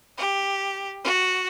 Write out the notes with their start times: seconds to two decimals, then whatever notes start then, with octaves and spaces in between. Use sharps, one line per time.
0.18 G4
1.03 F#4